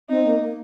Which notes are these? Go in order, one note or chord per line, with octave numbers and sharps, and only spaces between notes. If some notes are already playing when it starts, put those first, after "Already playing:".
C4 D#4
A#3
A#3